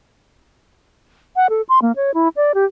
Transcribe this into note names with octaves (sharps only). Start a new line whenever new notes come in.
F#5
A4
C6
A#3
C#5
E4
D5
G4